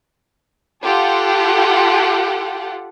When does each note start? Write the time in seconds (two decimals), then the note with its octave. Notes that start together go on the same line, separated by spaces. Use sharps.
0.84 F4 G4 A4 F#5